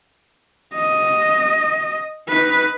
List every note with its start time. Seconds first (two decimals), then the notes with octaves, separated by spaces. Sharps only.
0.74 D#5
2.29 D#4 B4